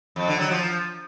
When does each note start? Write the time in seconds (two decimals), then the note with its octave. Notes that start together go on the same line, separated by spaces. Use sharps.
0.16 F2
0.28 D3
0.39 F#3
0.51 F3